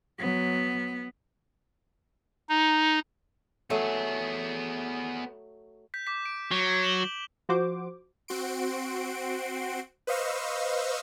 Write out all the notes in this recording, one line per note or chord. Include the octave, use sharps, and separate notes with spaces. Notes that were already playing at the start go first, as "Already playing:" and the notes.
F#3 B3
D#4
F#3 A3 B3 G#4
G6 B6
D6 B6
D7
F#3
E7 F#7 G7
F3 F#4 C5 D6
C4 F#4 C6 D7
B4 C5 D#5 F5 C#6 E6